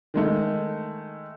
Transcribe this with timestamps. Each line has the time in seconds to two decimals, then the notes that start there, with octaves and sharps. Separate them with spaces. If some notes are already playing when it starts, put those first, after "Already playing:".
0.14 D#3 G#3 A3